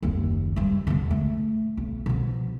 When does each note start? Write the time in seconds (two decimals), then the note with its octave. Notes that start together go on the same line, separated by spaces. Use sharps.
0.02 F#1 D#2
0.56 G2 G3
0.87 E1 D3
1.11 A3
1.77 B1
2.06 B2 F3